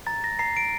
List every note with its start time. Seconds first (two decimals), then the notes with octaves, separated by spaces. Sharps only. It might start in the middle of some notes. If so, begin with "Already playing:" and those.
0.07 A#5 A6
0.24 A#6
0.39 A#5 C7
0.57 D7